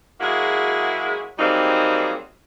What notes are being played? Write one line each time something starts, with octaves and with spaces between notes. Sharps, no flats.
F#3 G#3 A#3 E4 F#4 G#4
F#3 G3 A#3 C4 D#4 G#4